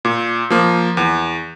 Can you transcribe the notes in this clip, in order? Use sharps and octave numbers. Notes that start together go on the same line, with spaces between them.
A#2
F3 A#3
E2